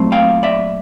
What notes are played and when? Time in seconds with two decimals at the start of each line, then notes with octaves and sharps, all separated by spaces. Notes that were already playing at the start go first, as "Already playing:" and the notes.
Already playing: A#2 F#3 A3 C4
0.12 F5 G5
0.43 D5 E5